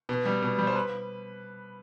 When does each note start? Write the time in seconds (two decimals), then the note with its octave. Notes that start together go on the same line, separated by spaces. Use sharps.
0.09 B2
0.25 G3
0.42 B2
0.58 G3
0.67 C5
0.76 B4